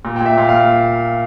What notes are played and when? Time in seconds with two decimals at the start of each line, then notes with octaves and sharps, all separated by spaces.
0.05 A#2
0.16 G5
0.21 A#2 E5
0.37 A#2 F5
0.49 F5